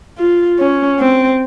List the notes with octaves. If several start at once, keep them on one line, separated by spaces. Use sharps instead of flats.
F4
C#4
C4